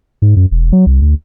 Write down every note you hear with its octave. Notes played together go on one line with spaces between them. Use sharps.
G#2
F#2
E1
F#3
C2
D2